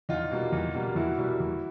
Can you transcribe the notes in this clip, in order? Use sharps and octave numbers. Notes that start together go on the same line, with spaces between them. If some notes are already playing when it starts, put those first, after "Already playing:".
E2 D#4 F4
B2 G3 A#3
E2
B2 G3 A#3
E2 E4 F#4
B2 G3 A#3
E2